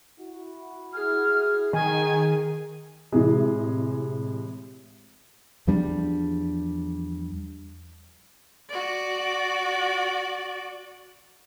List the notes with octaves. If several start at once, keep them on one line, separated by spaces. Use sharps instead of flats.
E4 F#4
G#4 F6
D#3 G#4 G#5
A2 C3 E3 G#3
E2 F3 G3 D4
F#4 D5